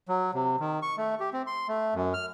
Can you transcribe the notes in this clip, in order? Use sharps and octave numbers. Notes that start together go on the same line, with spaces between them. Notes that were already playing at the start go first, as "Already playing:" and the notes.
F#3
C3
D#3
C#6
A3
G4
C4
C6
A3
F#2
F6